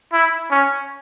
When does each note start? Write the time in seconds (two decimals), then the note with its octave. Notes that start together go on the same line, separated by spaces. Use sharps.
0.13 E4
0.51 C#4